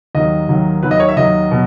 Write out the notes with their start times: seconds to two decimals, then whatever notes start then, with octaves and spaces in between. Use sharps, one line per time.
0.15 D#2 D#3 F#3 D#5
0.49 D#2 D#3 F#3
0.82 D#2 D#3 F#3 B4
0.91 D#5
1.00 C#5
1.08 E5
1.17 D#2 D#3 F#3 D#5
1.51 B2 F#3